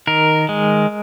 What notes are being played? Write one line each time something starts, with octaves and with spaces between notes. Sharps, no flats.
D#3 A#4
G#3